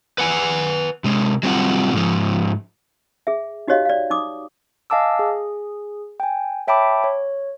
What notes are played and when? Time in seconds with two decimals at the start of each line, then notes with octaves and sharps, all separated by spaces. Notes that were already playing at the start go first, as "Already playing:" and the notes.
0.18 B4 F#5 G#5
1.04 C3 G#3
1.43 F#3 G3 C4 F4 F#5
1.93 G#2 F3
3.27 G#4 E5
3.68 D#4 F#4 G4 C#5 D#5 F5
3.85 D5 F5
4.10 D#4 D6 D#6
4.90 D#5 F5 G#5 A5 D6 E6
5.19 G#4
6.20 G5 G#5
6.67 C#5 E5 G5 A5 B5 D6
7.04 C#5